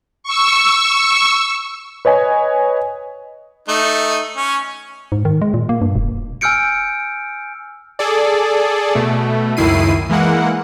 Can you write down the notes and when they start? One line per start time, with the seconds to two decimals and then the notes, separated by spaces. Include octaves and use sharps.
0.23 C#6 E6
2.05 B4 C#5 D#5 G#5
3.68 A3 D#4
4.37 C#4 C#5
5.12 G#2
5.25 D#3
5.42 G#3
5.54 A#2
5.69 A#3
5.82 G2
5.95 E1
6.41 G#5 E6 F6 G6 C#7 D7
7.99 G#4 A4 D5
8.95 B2 A3
9.57 C#2 F#2 D#3 E4 C7 D#7
10.09 E3 G#3 A#3 F#5